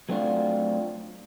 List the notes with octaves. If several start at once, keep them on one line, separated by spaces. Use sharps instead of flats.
F#3 A3 C4 D4 F4 F#4